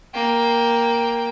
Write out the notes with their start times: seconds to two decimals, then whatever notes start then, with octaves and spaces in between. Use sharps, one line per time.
0.14 A#3 G5